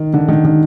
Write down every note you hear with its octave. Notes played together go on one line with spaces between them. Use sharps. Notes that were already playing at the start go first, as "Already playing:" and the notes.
Already playing: D#3
D3
D#3
D#3